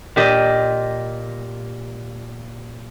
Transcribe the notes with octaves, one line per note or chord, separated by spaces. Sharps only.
A#2 G4 D#5